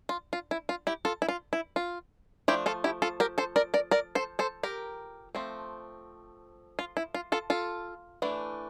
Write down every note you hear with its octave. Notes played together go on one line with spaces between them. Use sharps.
F4
F4
E4
F4
E4 G4
F4 A4
E4
F4
E4
F4
F3 A3 D4 E4 G4
F4 A4
E4 G4
F4 A4
G4 A#4
A4 C5
A#4 D5
A#4 D5
A#4 D5
A4 C5
A4 C5
G4 A#4
F3 A3 C4
F4
E4
F4
F4 A4
F4 A4
E3 A3 D4